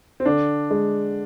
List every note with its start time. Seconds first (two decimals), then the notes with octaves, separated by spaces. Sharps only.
0.20 C4
0.26 D3 D4
0.71 G#3